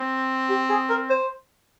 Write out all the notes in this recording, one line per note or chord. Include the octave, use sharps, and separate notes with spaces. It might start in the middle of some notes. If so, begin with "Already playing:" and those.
Already playing: C4
G4
G#4
A#4
C5